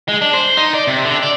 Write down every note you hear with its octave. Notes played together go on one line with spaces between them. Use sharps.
G#3
D4
C5
D#4
D5
C3
D3
D5